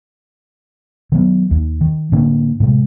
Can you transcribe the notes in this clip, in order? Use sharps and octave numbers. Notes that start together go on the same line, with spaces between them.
D#3 F#3 B3
D#2
D#3
A2 D3 A#3 D4
A2 C3 G#3